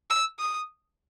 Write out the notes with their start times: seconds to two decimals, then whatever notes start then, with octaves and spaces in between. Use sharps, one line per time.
0.10 E6
0.39 D#6